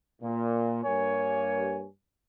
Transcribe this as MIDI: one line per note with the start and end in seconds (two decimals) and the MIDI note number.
0.21 0.80 46
0.84 1.83 43
0.84 1.83 58
0.84 1.83 73
0.84 1.83 80